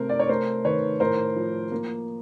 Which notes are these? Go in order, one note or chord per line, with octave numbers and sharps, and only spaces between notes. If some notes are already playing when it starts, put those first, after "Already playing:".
Already playing: C3 A3 A#4 C5
D5
C#5
A3 A#4 C5
D#3 B4 C#5
A2 A#4 C5
F3
A#3